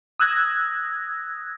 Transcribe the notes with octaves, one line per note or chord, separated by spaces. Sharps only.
D#6 E6 F#6 G#6 A#6